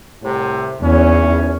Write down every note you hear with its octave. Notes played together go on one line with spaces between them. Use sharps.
C2 A2 C3
G#1 E2 C#4